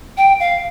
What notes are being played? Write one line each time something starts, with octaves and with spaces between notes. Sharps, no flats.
G5
F5